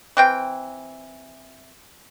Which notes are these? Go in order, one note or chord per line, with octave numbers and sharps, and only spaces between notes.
E3 C4 G5